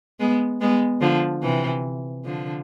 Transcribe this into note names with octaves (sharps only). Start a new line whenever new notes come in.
G#3 B3
G#3 B3
D3 F3
C3 E3
D3 F3